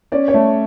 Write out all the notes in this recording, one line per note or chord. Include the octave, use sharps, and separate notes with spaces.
C#4 D5
C#5
A3